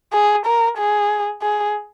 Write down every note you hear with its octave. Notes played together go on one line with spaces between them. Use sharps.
G#4
A#4
G#4
G#4